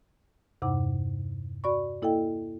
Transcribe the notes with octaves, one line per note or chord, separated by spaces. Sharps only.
E2 G2 C3 D#4 F#5 D6
F#4 D5 B5 C#6
A#3 E4 A4 D#5 F5 G5